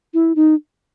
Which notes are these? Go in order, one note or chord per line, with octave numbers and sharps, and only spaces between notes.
E4
D#4